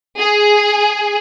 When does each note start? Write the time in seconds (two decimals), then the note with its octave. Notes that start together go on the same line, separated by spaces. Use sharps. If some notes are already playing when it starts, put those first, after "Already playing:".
0.18 G#4